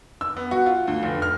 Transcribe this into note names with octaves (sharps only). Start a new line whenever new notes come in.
E6
B3
F#4
F4
D2
F1
F6